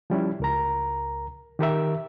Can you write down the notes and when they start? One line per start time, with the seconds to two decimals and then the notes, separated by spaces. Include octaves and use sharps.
0.10 F3 G3 C#4 E4
0.40 C#2 A#4 A#5
1.59 D#3 G4 A#4 E5